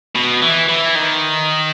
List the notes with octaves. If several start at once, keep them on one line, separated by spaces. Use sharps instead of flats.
B2
E3
E3
D#3